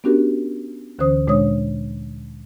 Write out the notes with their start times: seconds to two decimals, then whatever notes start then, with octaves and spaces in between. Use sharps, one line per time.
0.04 B3 C#4 D4 F#4 G4 A#4
0.99 D2 D3 E3 C#4 C5 D#6
1.28 A#2 G#3 D4 C#5 D#6